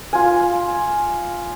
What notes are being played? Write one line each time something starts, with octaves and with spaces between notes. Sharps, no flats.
F4 G#5